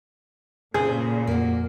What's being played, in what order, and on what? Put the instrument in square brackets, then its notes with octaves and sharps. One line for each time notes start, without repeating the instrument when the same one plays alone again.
[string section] A#2 [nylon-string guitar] C#3 C5 [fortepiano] G#4
[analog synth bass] F2 [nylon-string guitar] A#3 F#4